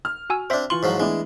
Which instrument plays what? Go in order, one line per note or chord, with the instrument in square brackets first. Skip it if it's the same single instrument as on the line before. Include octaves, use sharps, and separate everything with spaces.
[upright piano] F6
[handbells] F#4 G#5 E6
[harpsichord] C4 D4 [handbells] C5 E5
[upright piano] E3 F4 F#7 [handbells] C6 [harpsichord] C#6
[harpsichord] G#2 F3 F#3
[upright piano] E3 D4 E4 [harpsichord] G#3 [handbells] A3 B3